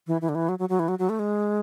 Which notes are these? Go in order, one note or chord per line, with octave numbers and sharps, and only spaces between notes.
E3
E3
D3
E3
F#3
F#3
F#3
E3
F#3
F#3
A3
G#3